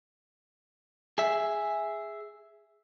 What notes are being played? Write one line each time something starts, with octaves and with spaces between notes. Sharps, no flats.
G#4 E5